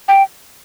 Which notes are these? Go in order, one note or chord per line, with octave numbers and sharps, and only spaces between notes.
G5